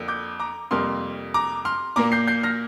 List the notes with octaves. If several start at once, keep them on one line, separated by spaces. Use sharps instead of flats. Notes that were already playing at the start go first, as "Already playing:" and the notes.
Already playing: F2 D3 A#3
D6 G6
A#5 D6
F2 C3 G3 A#3 C6 F6
A#5 D6
C6 F6
A#2 A#3 A#5 D6
G6 C7
G6 C7
F6 A#6